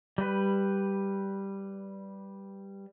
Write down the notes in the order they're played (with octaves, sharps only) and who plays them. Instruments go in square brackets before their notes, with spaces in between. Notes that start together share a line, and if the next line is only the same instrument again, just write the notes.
[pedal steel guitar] G3 B4